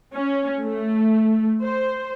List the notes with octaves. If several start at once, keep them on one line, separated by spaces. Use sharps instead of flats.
C#4
A3
C5